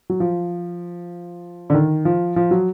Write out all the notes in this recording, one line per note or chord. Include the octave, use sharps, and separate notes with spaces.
F#3
F3
D3
D#3
F3
F3
F#3